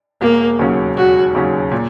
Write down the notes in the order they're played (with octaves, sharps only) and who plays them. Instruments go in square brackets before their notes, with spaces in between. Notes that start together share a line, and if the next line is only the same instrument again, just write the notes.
[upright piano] E1 [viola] A#3
[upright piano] D#2 C#3 F#3 C#4
[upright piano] E1 [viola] F#4
[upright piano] D#2 C#3 F#3 C#4
A#2